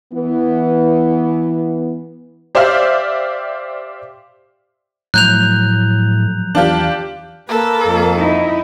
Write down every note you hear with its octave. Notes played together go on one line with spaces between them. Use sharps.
E3 B3
G4 C5 D5 E5 F5
A2 F3 F#3 A#5 F#6 G6 F7
E2 D4 F4 G4
A#3 A4 B4
F2
D#4 E4